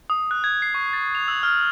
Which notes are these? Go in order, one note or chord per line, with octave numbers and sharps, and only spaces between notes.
D#6
F#6
G#6
C7
C#6
A6
F7
E6
F6